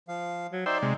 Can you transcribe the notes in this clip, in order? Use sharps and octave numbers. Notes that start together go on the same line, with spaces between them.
F3 F5
F#3
D#4 C5 D5 E5 G5
C3 G#3